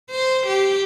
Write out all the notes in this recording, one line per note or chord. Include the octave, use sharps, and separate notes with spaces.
C5
G4